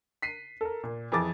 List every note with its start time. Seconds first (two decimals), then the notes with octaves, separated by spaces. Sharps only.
0.22 B6 C7 D#7
0.61 A4 A#4
0.83 A#2
1.12 F2 E3 G#4 D6 A6